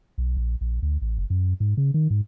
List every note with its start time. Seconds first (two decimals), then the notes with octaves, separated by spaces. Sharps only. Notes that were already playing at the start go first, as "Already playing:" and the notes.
0.18 B1
0.37 A#1
0.61 A#1
0.82 D2
1.02 A1
1.18 F#1
1.30 F#2
1.60 G#2
1.77 C#3
1.94 D#3
2.10 G#2